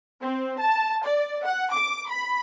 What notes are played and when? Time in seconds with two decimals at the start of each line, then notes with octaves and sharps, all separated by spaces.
0.22 C4
0.59 A5
1.05 D5
1.45 F#5
1.73 D6
2.10 B5